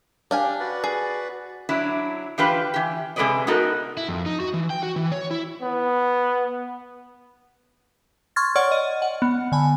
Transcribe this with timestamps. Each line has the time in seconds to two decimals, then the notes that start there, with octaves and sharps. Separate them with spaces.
0.31 D4 G4 F5 G#5
0.60 F#4 B4 D5
0.84 G#4
1.69 F#3 D4 E4
2.38 E3 D4 F4 G4 B4
2.74 E3 G4
3.16 C3 G#3 A4 B4 D5 D#5
3.47 B3 D#4 F#4 A4 A#4
3.97 E4
4.09 F2
4.26 D#4
4.40 F#4
4.54 E3
4.70 G5
4.83 F#4
4.96 E3
5.12 C#5
5.31 E4
5.62 B3
8.36 C6 C#6 F6 G#6 A6
8.56 C#5 D5 F#5 C#6 F6
8.72 D#5
9.02 F#5
9.22 B3
9.52 D3 G#5 B5